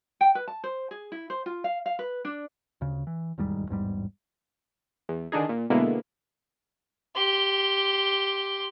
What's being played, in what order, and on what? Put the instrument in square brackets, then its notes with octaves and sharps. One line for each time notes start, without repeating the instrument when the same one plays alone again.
[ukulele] G5
B4
A5
C5
G#4
E4
C5
F4
F5
F5
B4
D4
[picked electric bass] D2 C#3
E3
E1 D#2 G#2 G3
A1 E2 G#2 G3
[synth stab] E2
D3 D#3 D4 D#4 G#4
A#2
B2 D3 G#3 A#3 B3 E4
[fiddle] G4 C6